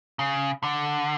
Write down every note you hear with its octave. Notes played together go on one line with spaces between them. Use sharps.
C#3
D3